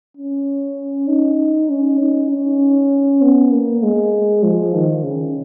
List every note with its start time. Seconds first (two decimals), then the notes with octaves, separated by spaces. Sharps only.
0.17 C#4
1.08 D#4
1.70 C#4
2.00 D#4
2.31 C#4
3.22 B3
3.52 A#3
3.83 G#3
4.43 F3
4.75 D#3
5.04 C#3